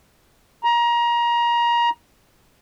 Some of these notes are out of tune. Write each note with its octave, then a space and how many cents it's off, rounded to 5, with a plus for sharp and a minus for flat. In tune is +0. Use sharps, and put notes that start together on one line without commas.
A#5 +25